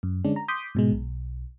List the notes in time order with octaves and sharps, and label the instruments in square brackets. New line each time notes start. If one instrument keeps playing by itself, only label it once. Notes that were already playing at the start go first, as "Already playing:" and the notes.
[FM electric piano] F#2
D3 G#3 C#4 D4
A#5
C6 D6 D#6 G6 B6
G#2 B2 G#3
B1